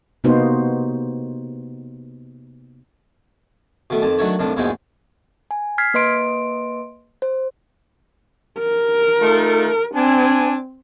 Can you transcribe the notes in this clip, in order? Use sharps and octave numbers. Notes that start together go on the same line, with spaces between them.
C3 A#3 B3 D#4 F#4 C5
B2 D#3 A3
F2 D#3 A5 D6
D#3 F#3 A3 D4 C#5
C2 A2 D#3 D4
A#1 E2 G#2 B2 G#3 G5
G#5
F6 G#6 B6 C7
A#3 B4 D#5 C6 D7
C5
A#4
A3 D#4 F4
C4 D4 G#5